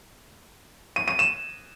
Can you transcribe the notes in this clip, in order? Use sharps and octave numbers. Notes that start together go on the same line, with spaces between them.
D#7
D#7
E7